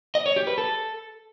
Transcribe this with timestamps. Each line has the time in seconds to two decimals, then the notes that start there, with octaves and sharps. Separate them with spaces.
0.15 D#5
0.26 C#5
0.36 G4
0.47 B4
0.58 A4